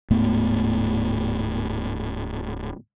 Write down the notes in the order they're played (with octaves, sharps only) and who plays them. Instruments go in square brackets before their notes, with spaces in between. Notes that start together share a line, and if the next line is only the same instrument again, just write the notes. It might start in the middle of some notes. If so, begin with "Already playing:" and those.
[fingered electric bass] D1 G#2 A3 B3